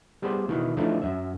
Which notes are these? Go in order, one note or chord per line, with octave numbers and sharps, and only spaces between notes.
G3 B3 G#4 C5 D5
B2 D#3 E3
D3 E3 F3 A3 D4 D#4
F#2 E5